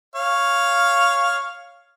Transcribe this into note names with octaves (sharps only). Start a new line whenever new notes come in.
C#5 F5